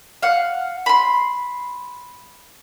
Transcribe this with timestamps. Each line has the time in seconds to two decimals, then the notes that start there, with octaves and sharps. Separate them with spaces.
0.22 F5 F#5
0.86 B5 C6